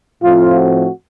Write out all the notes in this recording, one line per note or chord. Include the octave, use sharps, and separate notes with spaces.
A2 F3 A3 C4 F4
F#4